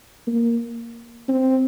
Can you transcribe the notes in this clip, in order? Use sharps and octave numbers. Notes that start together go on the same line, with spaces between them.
A#3
C4